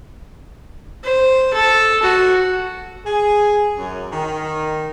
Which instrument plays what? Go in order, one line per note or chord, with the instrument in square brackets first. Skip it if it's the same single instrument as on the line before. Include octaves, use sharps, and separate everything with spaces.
[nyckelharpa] C5
A4
F#4
[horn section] G#4
F#2
D#3